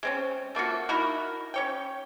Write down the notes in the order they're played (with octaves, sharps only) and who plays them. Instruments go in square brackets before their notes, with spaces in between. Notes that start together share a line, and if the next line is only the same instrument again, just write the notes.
[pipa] G#3 C4 C#4
A3 A#3 F4 F#4
D#4 E4 F#4 A#4
C#4 C#5 G5